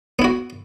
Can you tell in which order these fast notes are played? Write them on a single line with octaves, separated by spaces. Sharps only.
B3 E4 F#4